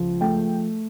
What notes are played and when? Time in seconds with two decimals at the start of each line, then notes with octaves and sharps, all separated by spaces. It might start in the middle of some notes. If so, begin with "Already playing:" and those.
Already playing: C#2 F3
0.21 A3 G5